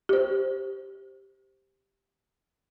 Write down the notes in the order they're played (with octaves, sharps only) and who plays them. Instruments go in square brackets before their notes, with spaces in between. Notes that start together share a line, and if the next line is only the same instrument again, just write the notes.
[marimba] G4 C5